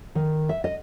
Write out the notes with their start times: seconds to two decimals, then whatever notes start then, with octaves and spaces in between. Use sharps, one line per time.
0.15 D#3
0.49 E5
0.64 D#5